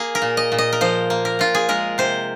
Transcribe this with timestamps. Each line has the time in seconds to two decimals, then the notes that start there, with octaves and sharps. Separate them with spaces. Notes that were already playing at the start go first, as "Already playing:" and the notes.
Already playing: A#3 G#4
0.15 A#4
0.22 A#2
0.37 D#5
0.52 A#2
0.58 D#5
0.73 A#4
0.81 F3 C5
1.10 A#3
1.25 A#4
1.39 A#2 F4
1.55 G#4
1.69 G#3 A#4
1.98 C3 C5